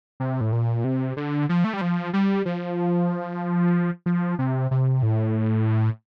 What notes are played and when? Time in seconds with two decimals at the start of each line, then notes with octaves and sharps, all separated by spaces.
0.20 C3
0.41 A2
0.52 A#2
0.84 C3
1.17 D3
1.49 F3
1.64 A3
1.73 G3
1.81 F3
2.13 G3
2.45 F3
4.06 F3
4.39 C3
4.71 C3
5.03 A2